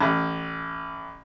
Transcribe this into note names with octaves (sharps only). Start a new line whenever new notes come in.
A1